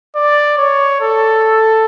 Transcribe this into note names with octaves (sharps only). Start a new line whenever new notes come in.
D5
C#5
A4